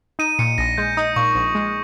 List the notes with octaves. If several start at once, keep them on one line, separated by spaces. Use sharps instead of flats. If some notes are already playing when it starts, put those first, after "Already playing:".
D#4 D#7
A#2 C#7
A#1 A#6
G#3 G6
D#4 D#6
A#2 C#6
A#1
G#3